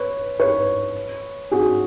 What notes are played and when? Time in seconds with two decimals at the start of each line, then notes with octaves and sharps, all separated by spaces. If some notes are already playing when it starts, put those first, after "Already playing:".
Already playing: B4 C#5
0.40 B4 C#5
1.51 F#4 G#4